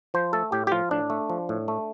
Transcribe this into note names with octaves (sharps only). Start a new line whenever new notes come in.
F3 C5
A3 A4
A2 G4
G4
F3 F4
A2 D4
A3
F3
A2
A3